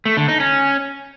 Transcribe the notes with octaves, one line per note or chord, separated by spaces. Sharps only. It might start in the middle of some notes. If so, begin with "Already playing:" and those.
A3
D3
D#4
C#4